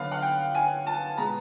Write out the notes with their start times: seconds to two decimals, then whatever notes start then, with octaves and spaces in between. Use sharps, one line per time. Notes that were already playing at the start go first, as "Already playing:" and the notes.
Already playing: D3 F#3 B3 F5
0.11 F#5
0.22 G5
0.55 G#5
0.86 A5
1.18 B2 G#3 B3 A#5